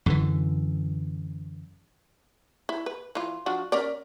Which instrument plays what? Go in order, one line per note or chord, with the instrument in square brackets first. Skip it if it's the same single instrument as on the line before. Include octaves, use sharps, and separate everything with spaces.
[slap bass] F#2 D3 E3
[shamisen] E4
B4
E3 F4
F3 D4 F#4
C#4 A#4 D5